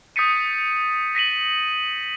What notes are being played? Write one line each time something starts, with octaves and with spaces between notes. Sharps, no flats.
D#6 G6 A6 B6 C#7 D#7
A#6 B6 D#7 F#7